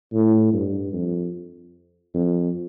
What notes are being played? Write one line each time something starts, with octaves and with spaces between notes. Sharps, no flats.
A2
G2
F2
F2